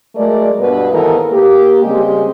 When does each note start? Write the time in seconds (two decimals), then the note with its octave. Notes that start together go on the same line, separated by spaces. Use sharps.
0.16 F#3 G#3 A3 A#4 D5
0.59 G2 B2 B4
0.91 D#2 G#2 E3 B3 A4 A#4
1.32 A#3 G4
1.84 C#3 G3 G#3 C4 G4